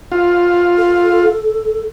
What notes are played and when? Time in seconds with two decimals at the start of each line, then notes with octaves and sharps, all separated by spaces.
0.12 F4
0.78 A4